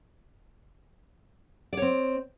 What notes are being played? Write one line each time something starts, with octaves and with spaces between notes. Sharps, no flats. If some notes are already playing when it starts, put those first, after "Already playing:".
C4 C#5 D5